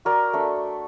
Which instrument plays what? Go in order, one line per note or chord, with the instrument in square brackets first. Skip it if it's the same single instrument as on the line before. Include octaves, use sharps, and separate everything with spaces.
[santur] F#4 A#4 D5
A3 D4